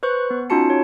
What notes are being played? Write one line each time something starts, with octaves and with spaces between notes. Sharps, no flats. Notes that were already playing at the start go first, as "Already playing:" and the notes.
B4 C5 C#6 F#6
B3
C#4 D#4 F4 F#4 A5 C#7
C#5